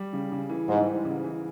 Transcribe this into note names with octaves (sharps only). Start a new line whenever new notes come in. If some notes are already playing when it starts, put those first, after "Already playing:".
Already playing: G3
C#3
C#3
E3
G#2 G3
E3
C#3
E3